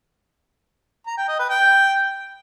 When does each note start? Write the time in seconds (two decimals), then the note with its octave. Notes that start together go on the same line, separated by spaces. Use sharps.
1.07 A#5
1.18 G5
1.28 D#5
1.39 B4
1.50 G5